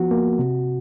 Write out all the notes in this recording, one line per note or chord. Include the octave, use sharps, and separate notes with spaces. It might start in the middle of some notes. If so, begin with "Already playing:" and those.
Already playing: F3 B3 F#4
A#3
C3